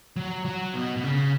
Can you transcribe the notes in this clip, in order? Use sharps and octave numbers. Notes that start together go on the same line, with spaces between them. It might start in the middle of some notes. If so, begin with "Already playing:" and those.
F#3
F#3
B2
B2
C#3